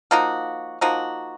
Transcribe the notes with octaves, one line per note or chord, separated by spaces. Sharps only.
F3 A#3 D#4 F#4
F3 A#3 D#4 F#4